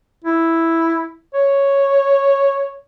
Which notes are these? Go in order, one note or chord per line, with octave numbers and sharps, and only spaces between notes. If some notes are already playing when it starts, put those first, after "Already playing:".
E4
C#5